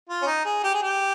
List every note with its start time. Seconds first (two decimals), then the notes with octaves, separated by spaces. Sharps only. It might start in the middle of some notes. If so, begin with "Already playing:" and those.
0.09 F4
0.22 C#4
0.27 D#4
0.45 G#4
0.63 G4
0.74 G#4
0.82 G4